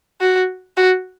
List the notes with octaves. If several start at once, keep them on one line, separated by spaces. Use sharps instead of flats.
F#4
F#4